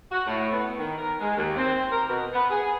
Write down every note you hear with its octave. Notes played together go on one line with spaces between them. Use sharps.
F#4
A2
B3
D#3
A#4
G#3
D#2
C4
A#4
B2
B3
G#4